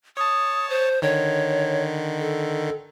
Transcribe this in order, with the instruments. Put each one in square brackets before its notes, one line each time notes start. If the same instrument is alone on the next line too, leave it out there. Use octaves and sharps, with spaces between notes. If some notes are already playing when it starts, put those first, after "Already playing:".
[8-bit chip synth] C#5 A5 [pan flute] D#6
[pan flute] C5
[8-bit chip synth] D3 D#3 [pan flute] C#5
[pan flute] A4